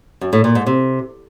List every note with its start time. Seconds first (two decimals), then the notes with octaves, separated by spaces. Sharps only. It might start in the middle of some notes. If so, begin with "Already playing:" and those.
0.21 F#2
0.33 A2
0.44 A#2
0.55 G#2
0.67 C3